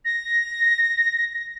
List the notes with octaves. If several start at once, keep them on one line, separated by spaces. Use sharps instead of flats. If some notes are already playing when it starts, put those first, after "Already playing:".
A#6